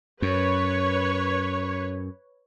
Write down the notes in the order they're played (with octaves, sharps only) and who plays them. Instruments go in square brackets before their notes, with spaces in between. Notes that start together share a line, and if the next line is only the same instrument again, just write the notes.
[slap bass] F#2 [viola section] B4 C#5